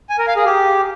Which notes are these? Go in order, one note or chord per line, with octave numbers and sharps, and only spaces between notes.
G#5
A#4
F5
G#4
G4